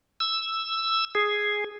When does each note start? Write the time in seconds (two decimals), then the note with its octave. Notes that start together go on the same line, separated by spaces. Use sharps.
0.20 E6
1.15 G#4